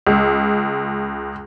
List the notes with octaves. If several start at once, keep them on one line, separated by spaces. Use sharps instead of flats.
C#2